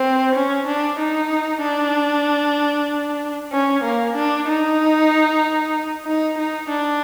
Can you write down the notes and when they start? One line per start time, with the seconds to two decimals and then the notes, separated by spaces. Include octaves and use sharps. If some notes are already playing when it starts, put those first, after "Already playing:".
Already playing: C4
0.35 C#4
0.67 D4
0.99 D#4
1.62 D4
3.52 C#4
3.84 A#3
4.16 D4
4.48 D#4
6.06 D#4
6.38 D#4
6.69 D4